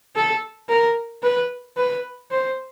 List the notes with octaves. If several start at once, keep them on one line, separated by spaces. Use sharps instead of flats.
A4
A#4
B4
B4
C5